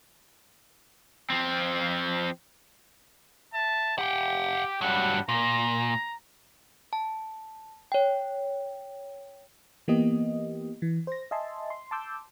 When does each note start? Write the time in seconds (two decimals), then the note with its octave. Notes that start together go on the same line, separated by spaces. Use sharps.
1.30 F3 C4
3.53 E5 A5
3.98 G4 F#5 G5
4.81 G2 F#3 G3 F#5
5.29 A#2 A#5
6.93 A5
7.92 C#5 G5
9.88 E3 A#3 B3 G4 D#5
10.82 E3
11.07 C5 A#6
11.31 D#5 E5 G#5 A5 C6
11.70 C6
11.91 A5 C6 D6 E6 G6